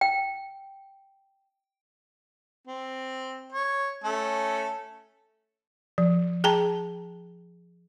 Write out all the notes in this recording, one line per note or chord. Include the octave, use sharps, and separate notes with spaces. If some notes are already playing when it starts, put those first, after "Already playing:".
G5
C4
C#5
A3 C#4 A4
F3
G#4 G5 A5 A#5